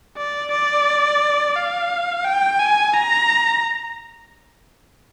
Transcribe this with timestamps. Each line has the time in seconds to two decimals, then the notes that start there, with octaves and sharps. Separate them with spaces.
0.17 D5
0.52 D5
1.56 F5
2.25 G5
2.59 G#5
2.94 A#5